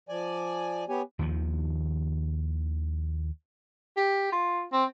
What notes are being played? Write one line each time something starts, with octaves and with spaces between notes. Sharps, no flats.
F3 D5 G#5
B3 G4 C#5 G#5
D#2 D#3 F3
G4
F4
C4